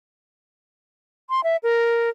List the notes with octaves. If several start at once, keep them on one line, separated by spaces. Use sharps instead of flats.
C6
E5
A#4